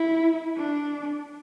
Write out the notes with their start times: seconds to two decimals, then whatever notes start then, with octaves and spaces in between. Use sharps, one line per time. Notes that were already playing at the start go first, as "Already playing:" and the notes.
Already playing: E4
0.57 D4